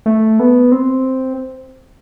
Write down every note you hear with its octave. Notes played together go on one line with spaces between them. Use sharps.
A3
B3
C4